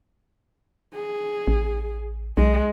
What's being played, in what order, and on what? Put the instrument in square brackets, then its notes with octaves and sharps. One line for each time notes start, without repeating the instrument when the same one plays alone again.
[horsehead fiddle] G#4
[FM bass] A1
[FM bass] B1 [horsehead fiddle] G#3